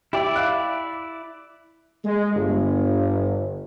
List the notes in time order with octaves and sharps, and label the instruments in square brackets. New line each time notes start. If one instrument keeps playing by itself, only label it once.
[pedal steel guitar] E4 D5 [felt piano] G4 E5 G5
[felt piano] E5 F5 F#6
[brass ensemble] G#3
G1